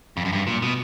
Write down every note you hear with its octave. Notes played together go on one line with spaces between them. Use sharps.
F2
F#2
G2
A#2
B2